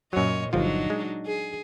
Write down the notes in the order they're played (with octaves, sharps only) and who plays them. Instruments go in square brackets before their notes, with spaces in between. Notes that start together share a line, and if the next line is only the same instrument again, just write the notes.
[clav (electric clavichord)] F#2 F#3 [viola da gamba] A#2 C#5 D#5
[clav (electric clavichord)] G1 F3 F4 [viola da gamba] F#3 D4 D#4
[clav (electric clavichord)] G#3
[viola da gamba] G#4